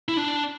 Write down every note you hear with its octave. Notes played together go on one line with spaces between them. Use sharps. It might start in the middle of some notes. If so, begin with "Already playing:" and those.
E4
D4